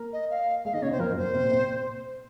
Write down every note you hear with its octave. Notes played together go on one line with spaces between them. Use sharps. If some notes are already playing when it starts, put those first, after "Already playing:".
Already playing: A#3 A#4
D#5
F5
G#3 G#4 F5
D#3 D#4 D#5
C#3 C#4 C#5
C3 C4 C5
F2 F3 A#4
F#2 F#3
C5
C3 C4
A#2 A#3
C3 C4